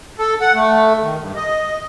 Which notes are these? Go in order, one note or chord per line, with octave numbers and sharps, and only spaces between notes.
A4
F#5
A3
D#3
G2
D#5